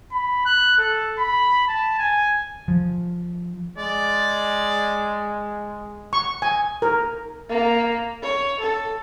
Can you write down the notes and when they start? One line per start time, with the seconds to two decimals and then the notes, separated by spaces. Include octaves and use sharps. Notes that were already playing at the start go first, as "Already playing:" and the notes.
0.12 B5
0.46 F#6
0.78 A4
1.19 B5
1.68 A5
1.99 G#5
2.68 F3
3.77 G#3 D5
6.13 C#6
6.42 G#5
6.82 A#4
7.49 A#3
8.23 C#5
8.60 A4